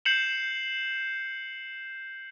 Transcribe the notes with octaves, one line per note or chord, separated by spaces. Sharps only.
G6 C7 C#7 E7 F#7